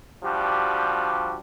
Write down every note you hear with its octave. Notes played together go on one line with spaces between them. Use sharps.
F3 G3 D4 F#4 G4